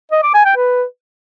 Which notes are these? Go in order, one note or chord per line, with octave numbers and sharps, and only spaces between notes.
D#5
D6
G#5
G5
B4